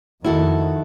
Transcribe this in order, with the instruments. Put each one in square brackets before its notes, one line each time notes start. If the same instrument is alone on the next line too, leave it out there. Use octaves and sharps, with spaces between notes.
[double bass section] F2 D#3 [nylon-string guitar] E4 F#4 A4